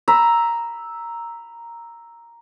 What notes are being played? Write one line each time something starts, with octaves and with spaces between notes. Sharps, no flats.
A#5 B5 E6